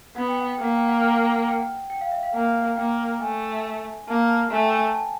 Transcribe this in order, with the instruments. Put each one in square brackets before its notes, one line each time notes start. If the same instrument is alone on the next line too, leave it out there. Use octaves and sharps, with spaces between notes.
[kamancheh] B3 [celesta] F#5
[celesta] G5
F#5
G5
[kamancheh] A#3 [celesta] F#5
[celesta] G5
F#5
G5
F#5
G5
F#5
G5
F#5
G5
F5
E5
F5
[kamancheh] A#3 [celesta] F#5
[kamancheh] A#3 [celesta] G5
[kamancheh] A3 [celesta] G#5
[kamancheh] A#3 [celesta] A5
[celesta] A5
[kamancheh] A3 [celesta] G#5
[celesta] G5
G#5
A5
A5